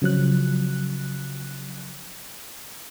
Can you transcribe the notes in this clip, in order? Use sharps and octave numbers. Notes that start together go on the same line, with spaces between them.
C#3 F3 F#3 F#6